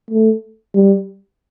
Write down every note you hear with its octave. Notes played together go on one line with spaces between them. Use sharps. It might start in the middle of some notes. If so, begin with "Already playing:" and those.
A3
G3